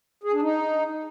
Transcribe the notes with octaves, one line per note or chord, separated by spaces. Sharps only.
G#4
D4
D#4